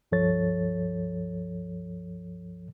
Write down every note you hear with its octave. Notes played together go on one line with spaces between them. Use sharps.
C#2 G2 F3 A4 C#5 A6